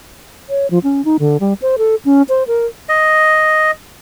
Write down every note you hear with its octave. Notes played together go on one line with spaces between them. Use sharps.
C#5
F3
C#4
D#4
D3
G3
C5
A4
C#4
C5
A#4
D#5